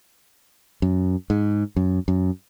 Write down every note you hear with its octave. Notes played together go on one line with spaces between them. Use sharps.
F#2
G#2
F#2
F#2